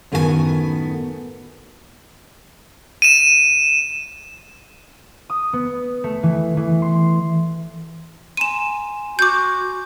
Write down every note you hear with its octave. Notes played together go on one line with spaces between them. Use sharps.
F#2 A2 D#3 B3 F4 G#5
D#7 E7
D#6
B3
A3
E3
E3
C6
G#5 A#5 C6 D#7 E7
F#4 D6 G6